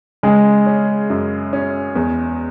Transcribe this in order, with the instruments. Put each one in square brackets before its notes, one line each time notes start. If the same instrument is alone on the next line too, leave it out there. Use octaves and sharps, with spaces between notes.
[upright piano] C#3 [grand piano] G#3
[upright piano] C#4
F#2
C#4
E2